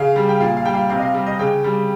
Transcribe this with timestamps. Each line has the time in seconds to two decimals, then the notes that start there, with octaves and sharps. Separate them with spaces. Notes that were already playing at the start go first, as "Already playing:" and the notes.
Already playing: C#3 F5
0.16 G3
0.29 G5
0.40 A#2 F5
0.57 F5
0.65 G3 G5
0.74 F5
0.90 C3 F5
0.98 D#5
1.02 F5
1.14 G3
1.27 D#5
1.39 C#3 G5
1.64 G3